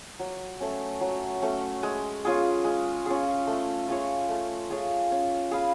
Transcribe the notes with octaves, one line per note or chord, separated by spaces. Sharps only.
F#3
A3 C#4
F#3
A3 C#4
G#3
C#4 F4 G#4
G#3
C#4 F4 G#4
A3
F4 G#4 C#5
A3
F4 G#4 C#5
C#4
G#4 B4 F5